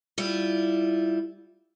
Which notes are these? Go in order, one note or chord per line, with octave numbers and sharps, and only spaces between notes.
G3 E4 F4